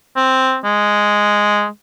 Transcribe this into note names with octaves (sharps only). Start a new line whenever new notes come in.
C4
G#3